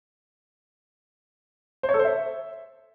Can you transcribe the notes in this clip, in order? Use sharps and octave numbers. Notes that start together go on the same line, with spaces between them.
C5
C#5
A4
C5
E5